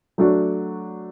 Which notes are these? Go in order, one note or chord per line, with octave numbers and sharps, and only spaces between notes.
F#3 A3 D4 F#4